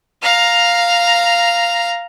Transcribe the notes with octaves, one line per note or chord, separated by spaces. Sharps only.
F5 A#5